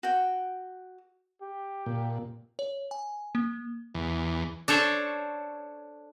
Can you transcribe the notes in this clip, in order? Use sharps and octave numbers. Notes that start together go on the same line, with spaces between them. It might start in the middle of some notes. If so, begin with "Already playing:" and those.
F#4 G5
G4
A#2
C#5
G#5
A#3
E2
D4 A4 C5 C#5